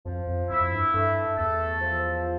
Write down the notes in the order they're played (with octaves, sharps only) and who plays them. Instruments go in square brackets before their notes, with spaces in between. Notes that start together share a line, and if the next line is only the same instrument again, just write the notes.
[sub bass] F2 [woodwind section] F3
[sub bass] F2
[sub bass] F2 [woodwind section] E4
[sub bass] F2
G2
[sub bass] G2 [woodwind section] A3
[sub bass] E2 [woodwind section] A4
[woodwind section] F3